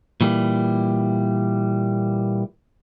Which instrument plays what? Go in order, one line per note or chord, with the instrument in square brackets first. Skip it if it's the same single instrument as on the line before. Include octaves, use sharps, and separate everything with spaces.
[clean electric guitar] A#2 E3 G3